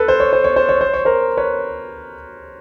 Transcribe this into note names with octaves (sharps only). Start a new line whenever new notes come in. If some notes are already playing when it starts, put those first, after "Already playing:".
Already playing: A4 B4
C5
C#5
C5
C#5
C5
C#5
C5
C#5
A#4 C5
B4 C#5